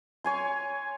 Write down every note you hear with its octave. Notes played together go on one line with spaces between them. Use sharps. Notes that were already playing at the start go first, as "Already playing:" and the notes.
C#5 G#5 C6